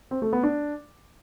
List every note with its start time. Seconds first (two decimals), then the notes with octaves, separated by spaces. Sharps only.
0.11 C4
0.22 A3
0.33 B3
0.43 D4